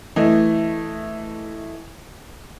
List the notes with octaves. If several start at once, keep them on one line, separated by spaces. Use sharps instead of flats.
E3 A3 D#5